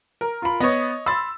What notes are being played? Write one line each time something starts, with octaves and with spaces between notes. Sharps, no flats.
A#4
F4 B5
B3 C#5 D#5
B5 C6 E6 A6